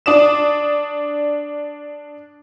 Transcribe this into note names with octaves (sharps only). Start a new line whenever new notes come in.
D4 D5 D#6 E7